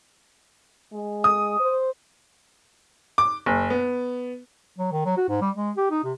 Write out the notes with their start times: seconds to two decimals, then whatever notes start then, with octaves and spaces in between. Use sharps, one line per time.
0.93 G#3
1.24 D#6
1.60 C5
3.18 D6
3.46 F#1
3.70 B3
4.78 F#3
4.91 D#3
5.05 F#3
5.17 F#4
5.28 G#2
5.41 G3
5.55 G#3
5.77 G4
5.91 D#4
6.04 C3